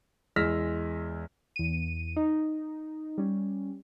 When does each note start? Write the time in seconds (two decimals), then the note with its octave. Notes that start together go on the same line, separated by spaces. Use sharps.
0.36 E2 G#3 E6 F6 A#6 B6
1.56 E2 D#7
2.16 D#4
3.18 G3 C#4